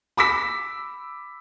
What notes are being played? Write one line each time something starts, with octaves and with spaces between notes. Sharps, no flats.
B5 D6 E6 B6